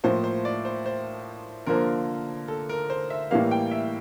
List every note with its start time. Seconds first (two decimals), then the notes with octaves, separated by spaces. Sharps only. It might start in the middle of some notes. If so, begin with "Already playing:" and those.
0.04 A2 F3 A#3 C5
0.24 C5
0.45 D5
0.65 C5
0.86 C5
1.67 D3 F3 A#3 A#4
2.48 A4
2.69 A#4
2.90 C5
3.10 E5
3.31 A2 E3 G3 A#3 F5
3.51 G5
3.71 E5